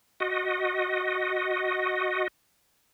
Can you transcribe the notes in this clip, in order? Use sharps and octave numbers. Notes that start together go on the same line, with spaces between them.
F#4 D#5